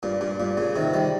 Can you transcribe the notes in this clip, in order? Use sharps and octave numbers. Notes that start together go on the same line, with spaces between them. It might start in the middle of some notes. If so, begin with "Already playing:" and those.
G2 A#2
G2 A#2
G2 A#2
A#2 C#3
C3 D#3
D#3 G3